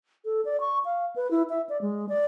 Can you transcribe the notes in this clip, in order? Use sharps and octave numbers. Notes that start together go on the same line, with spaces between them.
A4
D5
C#6
F5
B4
E4
E5
D5
G#3
D5